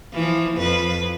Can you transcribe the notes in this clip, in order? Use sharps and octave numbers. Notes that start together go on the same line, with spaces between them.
E3 F3
F2 B4